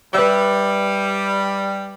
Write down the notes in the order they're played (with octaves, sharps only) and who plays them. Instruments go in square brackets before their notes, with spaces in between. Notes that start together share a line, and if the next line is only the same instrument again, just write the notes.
[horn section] G3 [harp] B4 E5